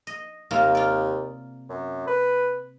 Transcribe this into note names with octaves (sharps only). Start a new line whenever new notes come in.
D#5
D#2 C3 A#3 F4
F4 D5
F#2
B4